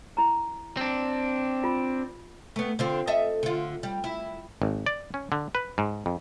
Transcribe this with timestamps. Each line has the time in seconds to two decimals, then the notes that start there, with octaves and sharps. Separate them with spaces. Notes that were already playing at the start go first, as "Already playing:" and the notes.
0.17 E4 A#5
0.77 C4 D4
1.64 F4
2.56 A3 B3
2.79 D3 C4 F4
3.07 A4 D#5 E5
3.43 D3 F4
3.83 G3
4.04 E4
4.62 G#1
4.86 D5
5.14 C#4
5.32 D3
5.55 B4
5.78 G#2
6.06 F2